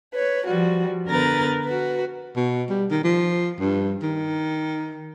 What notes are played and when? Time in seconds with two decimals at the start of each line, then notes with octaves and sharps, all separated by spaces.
0.14 B4 C#5
0.48 F3 G3 F#4
1.07 D3 B3 A#4 B4 A#5 A6
1.65 F#4 B4
2.36 B2
2.70 G3
2.91 D#3
3.04 F3
3.60 G2
4.02 D#3